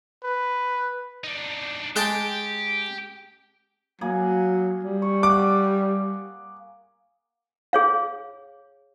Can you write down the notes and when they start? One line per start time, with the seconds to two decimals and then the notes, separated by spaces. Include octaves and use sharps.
0.24 B4
1.24 D4 D#4
1.96 G#3 G4 G5 A5
4.01 F#3 A#3 G#4
4.84 G3
5.02 C#6
5.23 F#5 D6
7.73 G#4 C#5 F5